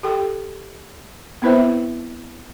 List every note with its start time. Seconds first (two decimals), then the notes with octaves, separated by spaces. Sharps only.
0.03 G4 A4 G5
1.42 B3 C4 E4 B4 C5 E5